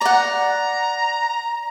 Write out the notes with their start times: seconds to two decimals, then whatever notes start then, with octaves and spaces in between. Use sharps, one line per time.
0.01 D5 F#5 A#5